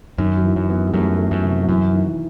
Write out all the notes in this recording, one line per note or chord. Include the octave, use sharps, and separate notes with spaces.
F#2 D#3
F#3
E3
F#2
B3
G3
F#2 A3
A3
F#2
C3
F#3
F#2 E3
D#3
E3